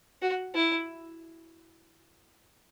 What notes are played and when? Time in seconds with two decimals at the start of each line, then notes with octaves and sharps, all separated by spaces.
0.22 F#4
0.54 E4